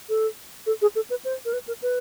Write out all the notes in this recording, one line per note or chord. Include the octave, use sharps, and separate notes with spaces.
A4
A4
G#4
A4
B4
C5
A#4
B4
A#4
B4